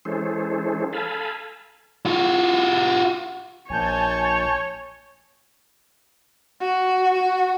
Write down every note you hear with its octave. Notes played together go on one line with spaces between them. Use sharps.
E3 G#3 C#4 G#4 A4 C5
A4 F5 G#5 A5 B5
F4 F#4
A#1 C#5 G#5 A5 G6
F#4
F#4